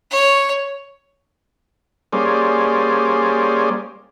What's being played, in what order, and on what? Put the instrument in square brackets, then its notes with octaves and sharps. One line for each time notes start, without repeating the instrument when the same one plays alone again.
[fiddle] C#5
[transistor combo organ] G3 A#3 C#4 G#4 C5 D5